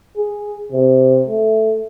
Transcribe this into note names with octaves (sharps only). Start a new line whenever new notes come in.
G#4
C3
A3